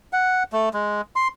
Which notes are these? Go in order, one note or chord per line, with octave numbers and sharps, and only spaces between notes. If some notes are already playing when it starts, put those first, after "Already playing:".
F#5
A3
G#3
C6